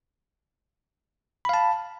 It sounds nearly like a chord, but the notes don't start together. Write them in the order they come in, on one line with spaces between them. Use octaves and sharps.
B5 F5 A5